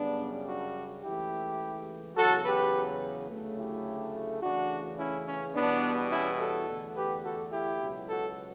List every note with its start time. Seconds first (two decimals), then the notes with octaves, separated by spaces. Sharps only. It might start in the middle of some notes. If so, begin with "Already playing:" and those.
Already playing: F#2 C#3 G3 B3 D4
0.47 D4 F#4
1.04 C#2 C#3 E3 A3 E4 G4
2.16 E2 C#3 F#3 F#4 A4
2.45 G4 B4
3.30 D2 C#3 F#3 A3
3.58 E4 G4
4.42 E2 C#3 E3 A3 D4 F#4
4.99 C#4 E4
5.27 C#4
5.55 E2 B2 G3 B3 D4
6.11 C#4 E4
6.40 F#4 A4
6.68 E2 D3 A3
6.96 G4 B4
7.25 F#4 A4
7.52 E4 G4
7.81 C#2 B2 F#3
8.09 F#4 A4